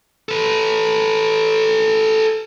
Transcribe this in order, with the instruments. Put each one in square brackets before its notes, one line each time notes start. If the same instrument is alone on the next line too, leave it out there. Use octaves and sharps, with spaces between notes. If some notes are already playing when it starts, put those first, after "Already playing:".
[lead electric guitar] A4 B4